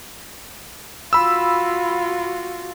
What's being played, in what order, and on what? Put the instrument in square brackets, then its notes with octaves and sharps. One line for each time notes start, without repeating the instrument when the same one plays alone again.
[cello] F4 F#4 [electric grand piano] B5 E6